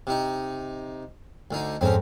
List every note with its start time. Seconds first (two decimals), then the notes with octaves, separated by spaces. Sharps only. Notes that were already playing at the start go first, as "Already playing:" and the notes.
0.07 C3 D#4
1.51 D2 D3 D#4
1.81 F2 G#2 C4 C#4